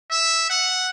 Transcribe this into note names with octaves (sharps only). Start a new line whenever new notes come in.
E5
F#5